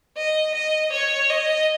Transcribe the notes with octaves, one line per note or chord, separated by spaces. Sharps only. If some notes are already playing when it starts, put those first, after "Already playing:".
D#5
D#5
C#5
D#5